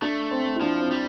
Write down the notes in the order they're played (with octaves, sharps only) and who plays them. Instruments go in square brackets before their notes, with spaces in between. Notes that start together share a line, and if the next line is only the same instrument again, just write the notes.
[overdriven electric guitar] A3 [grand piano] D4
[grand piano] C4
E4
[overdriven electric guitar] F3 [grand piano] D4
[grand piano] C4
[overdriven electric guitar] G3